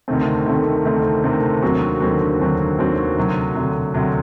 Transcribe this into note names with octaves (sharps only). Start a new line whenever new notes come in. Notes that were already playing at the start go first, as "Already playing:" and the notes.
D2 C3 D#3 A3 C4
D2 C3 D#3 A3 C4
D2 C3 D#3 A3 C4
D2 C3 D#3 A3 C4
D#2 D3 F#3 C4 F#4
D#2 D3 F#3 C4 F#4
D#2 D3 F#3 C4 F#4
D#2 D3 F#3 C4 F#4
D2 C3 F#3
D2 C3 F#3
D2 C3 F#3